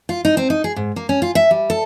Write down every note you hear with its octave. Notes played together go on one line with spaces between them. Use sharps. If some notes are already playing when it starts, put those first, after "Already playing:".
F4
D#4
C4
D#4
G#4
G#2
A#3
C#4
F4
E5
G3
A4